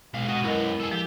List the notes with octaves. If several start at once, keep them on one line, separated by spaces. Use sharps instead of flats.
B1 G#3 F5
F#4 D#5 F#5
F#2 B3 E4 A#4 D#5
G#4 A4
F3 G4